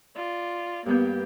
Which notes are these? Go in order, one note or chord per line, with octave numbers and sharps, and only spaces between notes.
F4 D5
G2 A#3 B3 G4 G6